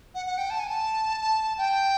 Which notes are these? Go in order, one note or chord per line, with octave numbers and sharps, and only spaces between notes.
F#5
F#5
G5
A5
G#5
A5
A5
G5